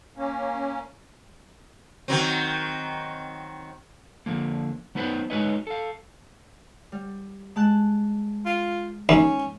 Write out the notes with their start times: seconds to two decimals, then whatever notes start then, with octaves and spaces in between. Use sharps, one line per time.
0.17 A#3 C#4
2.08 D#3 F#3 C4
4.26 D3 F3 A#3
4.95 F#3 B3 D#4 B4 C5
5.30 F#3 G#3 D#4 B4 C#5 D#5
5.67 A4 F5
6.92 G3
7.56 G#3 A5 F#6
8.45 F4
9.09 D#2 C#4